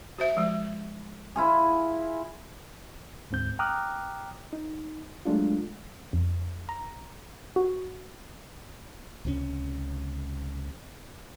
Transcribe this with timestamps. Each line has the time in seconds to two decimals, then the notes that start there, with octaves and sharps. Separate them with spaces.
0.18 F#4 C5 E5
0.37 F3 G#3
1.36 E4 F4 G#4
3.31 D2 G#2 C4 G6
3.59 G5 A#5 D6 D#6 F6 F#6
4.53 D#4
5.25 F#3 G#3 A3 D4 F4
6.13 F2
6.69 A#5
7.56 F#4
9.25 C#2 C3 D#3 C#4